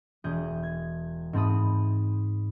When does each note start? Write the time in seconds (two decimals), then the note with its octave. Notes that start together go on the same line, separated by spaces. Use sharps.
0.24 E1 G#4 G6
0.63 G#6
1.33 G#2 C4 A5 B5 D#6